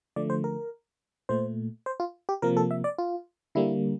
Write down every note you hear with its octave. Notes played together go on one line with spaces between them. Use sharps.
D3 F3 A3 D5
C5
A#4
A#2 A3 C5
C5
F4
G4
C3 F3 A#3 A#4
A4
E5
D5
F4
D3 G3 A#3 E4